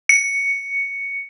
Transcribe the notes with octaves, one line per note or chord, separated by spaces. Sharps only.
C#7